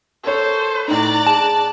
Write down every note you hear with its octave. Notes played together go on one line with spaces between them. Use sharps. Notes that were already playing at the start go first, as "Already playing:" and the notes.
A4 A#4 C5 C#5
A2 D#4 D5 A#5 F#6 A6
G#4 A5